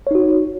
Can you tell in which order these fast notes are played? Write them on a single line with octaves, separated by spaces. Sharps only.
C#5 D#4 F#4